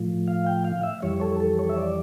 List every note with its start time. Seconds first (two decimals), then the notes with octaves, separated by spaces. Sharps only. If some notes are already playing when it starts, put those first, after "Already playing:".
Already playing: A2 F3
0.28 F5
0.46 G5
0.64 F5
0.83 E5
1.02 F2 E3 G3 C#5
1.21 A4
1.40 A4
1.59 C#5
1.69 E5
1.78 D5